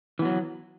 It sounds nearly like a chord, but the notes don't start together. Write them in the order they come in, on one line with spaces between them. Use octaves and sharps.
E3 B3 F#3